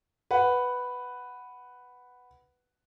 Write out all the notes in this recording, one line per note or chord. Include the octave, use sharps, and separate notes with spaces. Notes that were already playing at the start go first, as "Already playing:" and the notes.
B4 F#5